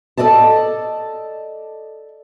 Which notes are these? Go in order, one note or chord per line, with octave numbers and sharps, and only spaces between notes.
A4 A#4 D5 D#5 A5